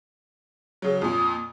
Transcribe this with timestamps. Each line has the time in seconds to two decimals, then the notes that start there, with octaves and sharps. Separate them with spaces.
0.82 C#3 F#3
1.02 F2 A#2 D#6